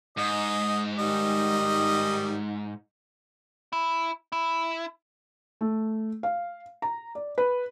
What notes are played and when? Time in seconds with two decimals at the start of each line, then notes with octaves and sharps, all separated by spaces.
0.18 G#2 D#5
0.99 D#3 G3 D#5
3.73 E4
4.32 E4
5.61 A3
6.23 F5
6.82 A#5
7.15 D5
7.38 B4